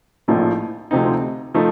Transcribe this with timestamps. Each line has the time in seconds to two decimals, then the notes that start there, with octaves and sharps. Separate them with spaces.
0.28 A#1 A2 F3 A3 D#4
0.91 D2 C3 F3 C4 D#4
1.54 F3 A3 D#4